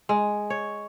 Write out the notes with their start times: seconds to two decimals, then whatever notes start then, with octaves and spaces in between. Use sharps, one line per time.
0.09 G#3
0.50 C#5